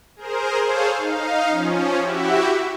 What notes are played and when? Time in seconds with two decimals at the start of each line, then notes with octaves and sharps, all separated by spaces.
0.16 G#4 A#4 C5
0.64 G#4 A4 C5 C#5 F5
0.97 D#4 F5
1.49 F3 C#4
1.99 E4 F#4 G4 E5